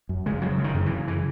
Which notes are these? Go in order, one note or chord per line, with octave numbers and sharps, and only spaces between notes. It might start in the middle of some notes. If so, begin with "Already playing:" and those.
F#2
C#3 G#3
F#2 F#3
C#3
D#3
F#2
E3
C#3
E3